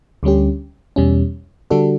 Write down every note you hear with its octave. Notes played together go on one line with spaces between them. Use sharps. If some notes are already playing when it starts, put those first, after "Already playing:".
D2 D3 G3 C#4 G4
E2 B2 G3 C#4
D3 G3 D4 F#4 A4